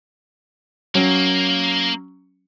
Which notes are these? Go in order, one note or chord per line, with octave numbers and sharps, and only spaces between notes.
F#3 A#3 C#4